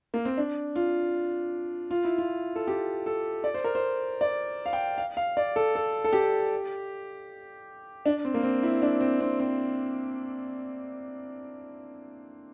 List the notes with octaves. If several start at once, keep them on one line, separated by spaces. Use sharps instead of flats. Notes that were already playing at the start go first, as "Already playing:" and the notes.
A#3
C4
D4
F4
F4
E4
F4
A4
G4
A4
D5
C5
A#4
C5
D5
F5
G5
F5
F5
D5
A4
A4
A4
G4
D4
C4
A#3
C4
E4
D4
C4
C4
C4